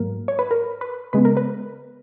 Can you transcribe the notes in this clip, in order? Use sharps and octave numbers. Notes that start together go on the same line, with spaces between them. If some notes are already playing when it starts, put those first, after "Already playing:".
Already playing: G#2 F#3 A#3 A#4
C#5
B4
A#4
B4
C#3 G#3 B3 B4
A#4
B4